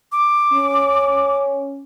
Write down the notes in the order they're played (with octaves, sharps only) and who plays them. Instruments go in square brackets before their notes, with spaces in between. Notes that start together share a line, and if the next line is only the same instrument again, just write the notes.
[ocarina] D6
[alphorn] C#4